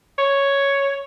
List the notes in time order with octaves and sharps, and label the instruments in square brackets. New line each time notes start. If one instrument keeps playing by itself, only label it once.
[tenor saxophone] C#5